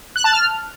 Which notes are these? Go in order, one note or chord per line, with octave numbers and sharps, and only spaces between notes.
F#6
A5
F6